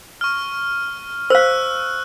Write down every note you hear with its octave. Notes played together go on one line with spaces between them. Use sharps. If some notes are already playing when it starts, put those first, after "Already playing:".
C#6 F6
C5 F5 E6 F#6